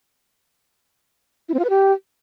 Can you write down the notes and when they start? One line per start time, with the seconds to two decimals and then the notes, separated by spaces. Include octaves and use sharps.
1.49 E4
1.54 C4
1.59 F4
1.64 B4
1.70 G4